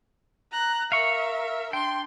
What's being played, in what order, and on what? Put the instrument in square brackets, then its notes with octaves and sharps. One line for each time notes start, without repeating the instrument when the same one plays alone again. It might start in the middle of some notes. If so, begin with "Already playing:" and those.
[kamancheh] A#5 F#6
[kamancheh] A#4 E5 [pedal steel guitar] F5 C#6
[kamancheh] D4 C6 [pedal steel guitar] G5